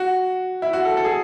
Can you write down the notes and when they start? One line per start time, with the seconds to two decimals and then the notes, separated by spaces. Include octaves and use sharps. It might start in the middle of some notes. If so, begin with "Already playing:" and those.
Already playing: F#4
0.62 E4
0.73 F#4
0.85 A4
0.97 A4
1.05 G#4